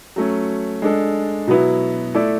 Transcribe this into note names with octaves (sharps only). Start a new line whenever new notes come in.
F#3 A3 C#4
G#3 D4 A4
B2 F#3 B3 E4
A3 E4 A4 D5